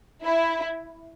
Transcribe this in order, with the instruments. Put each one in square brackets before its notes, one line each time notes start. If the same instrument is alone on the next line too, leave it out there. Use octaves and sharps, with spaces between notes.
[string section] E4